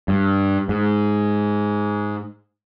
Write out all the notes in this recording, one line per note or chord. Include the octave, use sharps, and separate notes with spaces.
G2
G#2